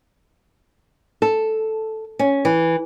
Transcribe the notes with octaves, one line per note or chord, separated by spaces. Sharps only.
A4
C#4
E3